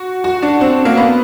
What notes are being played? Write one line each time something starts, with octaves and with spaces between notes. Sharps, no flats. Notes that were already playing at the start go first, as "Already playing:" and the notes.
Already playing: F#4
F#4
D4
C4
A#3
B3